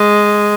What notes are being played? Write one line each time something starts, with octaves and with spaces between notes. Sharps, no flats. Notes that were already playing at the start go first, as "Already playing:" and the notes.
Already playing: G#3